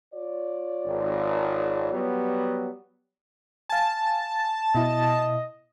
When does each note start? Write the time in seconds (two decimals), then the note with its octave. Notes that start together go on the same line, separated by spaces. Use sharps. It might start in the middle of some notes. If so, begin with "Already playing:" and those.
0.14 F4 C#5 D5
0.86 G#1
1.92 F#3 G3 B3
3.69 F5 G#5 A5
4.75 B2 E4 D#5